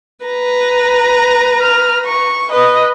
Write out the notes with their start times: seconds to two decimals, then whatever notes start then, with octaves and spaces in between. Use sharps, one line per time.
0.25 B4 A#5
1.61 F6
2.06 C#6
2.50 B4 D#5